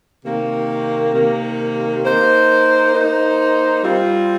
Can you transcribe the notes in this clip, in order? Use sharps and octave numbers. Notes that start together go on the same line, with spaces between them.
C3 D#3 A#3
C3 D#3 A#3
A#3 D#4 C5
A#3 D#4 C5
G3 C4 F4